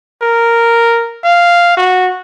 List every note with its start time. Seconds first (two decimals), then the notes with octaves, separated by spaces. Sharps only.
0.22 A#4
1.24 F5
1.77 F#4